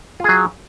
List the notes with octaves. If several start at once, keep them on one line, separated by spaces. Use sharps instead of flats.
F#3 F4 G#4